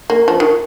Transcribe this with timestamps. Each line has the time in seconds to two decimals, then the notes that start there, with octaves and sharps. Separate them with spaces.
0.10 A#3
0.28 F3
0.40 D#3